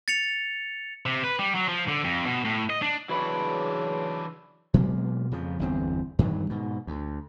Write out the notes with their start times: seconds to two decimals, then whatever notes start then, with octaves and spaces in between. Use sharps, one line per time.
0.08 A6 C#7 F7
1.06 C3
1.24 B4
1.39 G3
1.55 F#3
1.68 F3
1.88 D3
2.04 F2
2.26 B2
2.45 A2
2.70 D#5
2.82 D4
3.09 C#3 E3 F#3 D4 B4
4.74 B2 F#3 G#3 A#3
5.31 F2 C#3 F3
5.59 G1 E2 C4
6.19 G2 D#3 E3 F#3
6.49 G#2 B2
6.87 D2